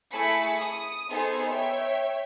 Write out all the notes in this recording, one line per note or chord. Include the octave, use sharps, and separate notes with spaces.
A3 E4 G#4 A5 B5 C#7
D#6
B3 D#4 G#4 A4 C5
C#5 E5 G5